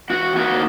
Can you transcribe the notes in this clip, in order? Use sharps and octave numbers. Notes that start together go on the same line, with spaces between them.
E2 F#4 F#5
D#3 A#3 D#4 F#4 F#5